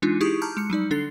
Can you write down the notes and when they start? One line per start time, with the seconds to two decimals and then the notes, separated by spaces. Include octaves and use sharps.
0.02 E3 G#3 D4 D#4 F4
0.21 D#4 E4 G4 G#4 C#6 D#6
0.42 A5 A#5 D6 F6 G6
0.57 G#3 C#7
0.70 F#3 G3 D#4 D5
0.91 D3 D4 A4 A6 C7